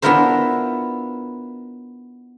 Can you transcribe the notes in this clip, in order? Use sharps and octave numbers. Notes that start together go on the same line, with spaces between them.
B3 D4 E4 F4 A#4 C5